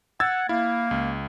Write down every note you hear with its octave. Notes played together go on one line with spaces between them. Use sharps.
F#5 E6 G#6 A6
A#3 E4 F5
C#2